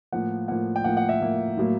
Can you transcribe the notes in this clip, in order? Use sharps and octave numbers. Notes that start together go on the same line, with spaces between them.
A2 F3 A#3 F#5
A2 F3 A#3 F#5
G5
A2 F3 A#3 F#5
F#5
E5
A2 F3 A#3
A2 F#3 A#3